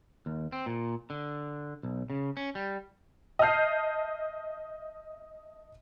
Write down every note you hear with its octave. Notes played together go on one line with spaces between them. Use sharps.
D#2
C4
A#2
D3
B1
C#3
C#4
G3
D#5 E5 A5 F6 G6 C7